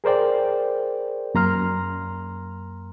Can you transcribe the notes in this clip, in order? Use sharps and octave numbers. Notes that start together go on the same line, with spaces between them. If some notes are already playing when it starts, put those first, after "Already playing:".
G#4 A#4 C5 D5 G5
F#2 A#3 A#5 C6 F6